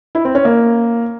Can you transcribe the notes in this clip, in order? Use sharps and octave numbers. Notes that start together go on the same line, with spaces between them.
E4
C4
C#4
A#3